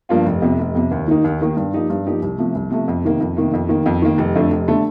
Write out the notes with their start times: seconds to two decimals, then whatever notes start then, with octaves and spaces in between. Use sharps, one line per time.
0.09 G2 F3 A#3 F4
0.26 F1
0.42 F2 C3
0.59 F1
0.75 F2 C3
0.91 D#2
1.08 D#3 A#3 D#4
1.24 D#2
1.41 D#3 A#3 D#4
1.57 G2
1.74 F3 A#3 D#4 G4
1.90 G2
2.06 F3 A#3 D#4 G4
2.22 C2
2.38 C3 F3 A3
2.55 C2
2.71 C3 F3 A3
2.88 F2
3.04 C3 D#3 A#3
3.20 F2
3.37 C3 D#3 A#3
3.53 F2
3.69 D#3 A#3
3.86 F2
4.02 D#3 A#3
4.18 F1
4.35 F2 D3 A3
4.51 F1
4.68 D3 A3